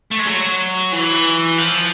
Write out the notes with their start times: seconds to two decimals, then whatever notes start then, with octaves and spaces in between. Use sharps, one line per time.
0.11 A3
0.19 G#3
0.27 F#3
0.92 E3
1.58 F3